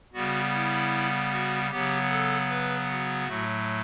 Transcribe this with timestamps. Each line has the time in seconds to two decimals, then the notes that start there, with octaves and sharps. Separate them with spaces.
0.13 C#3 G3 B3 F#4
0.53 E4
1.32 F#4
1.71 C#3 F#3 B3 G4
2.10 A4
2.49 B4
2.89 F#4
3.28 A2 F#3 A3